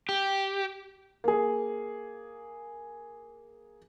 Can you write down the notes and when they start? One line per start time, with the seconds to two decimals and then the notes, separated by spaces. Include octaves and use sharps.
0.09 G4
1.24 A#3 G#4